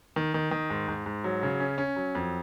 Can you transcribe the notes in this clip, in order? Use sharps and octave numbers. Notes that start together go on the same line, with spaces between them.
D#3
D#3
D#3
G#2
G#2
G#2
F#3
C#3
C#4
C#4
F#3
F2